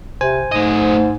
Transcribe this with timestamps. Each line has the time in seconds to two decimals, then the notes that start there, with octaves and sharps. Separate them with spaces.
0.21 C3 C5 G#5
0.52 G#2 A3 D#5